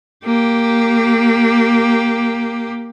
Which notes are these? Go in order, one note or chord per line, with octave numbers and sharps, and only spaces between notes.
A#3 G4